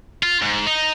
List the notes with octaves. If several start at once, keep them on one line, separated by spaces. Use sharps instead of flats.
F4
G#2
D#4